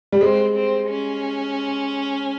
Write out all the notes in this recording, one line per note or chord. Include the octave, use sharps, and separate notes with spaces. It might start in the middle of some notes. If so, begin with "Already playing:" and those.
G3
G#3 C4
C4
C#4